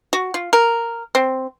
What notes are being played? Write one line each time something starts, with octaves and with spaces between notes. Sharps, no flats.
F#4
F4
A#4
C4